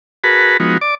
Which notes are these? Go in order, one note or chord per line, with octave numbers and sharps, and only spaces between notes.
F#4 G#4 A#4 B4 A5 B5
F3 G#3 B3 D#4 F#4
D5 D6